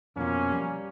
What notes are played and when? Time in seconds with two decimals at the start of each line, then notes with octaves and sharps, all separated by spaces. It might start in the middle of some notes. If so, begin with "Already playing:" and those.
0.16 F2 B2 F3 A#3 C#4
0.52 G3 G#5